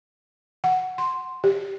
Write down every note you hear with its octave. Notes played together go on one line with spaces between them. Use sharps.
F#5
C6
G4